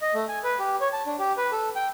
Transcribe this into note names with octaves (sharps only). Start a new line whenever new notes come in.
D#5
A3
G#5
B4
G4
C#5
A5
D4
G4
B4
A4
G5